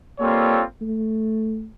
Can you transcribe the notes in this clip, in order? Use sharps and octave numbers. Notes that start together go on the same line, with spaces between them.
G3 A#3 C4 F4 A4 C#5
A3